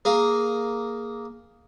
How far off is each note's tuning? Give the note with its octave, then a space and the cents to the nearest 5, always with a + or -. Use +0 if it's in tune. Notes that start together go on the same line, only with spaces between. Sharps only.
A#3 +0 G#4 +0